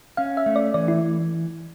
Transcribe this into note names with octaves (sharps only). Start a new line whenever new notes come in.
C#4 F5
E5
A3
D5
E3 D5
E4